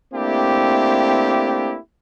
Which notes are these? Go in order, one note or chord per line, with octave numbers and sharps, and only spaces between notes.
A3 A#3 C4 D4 E4 G4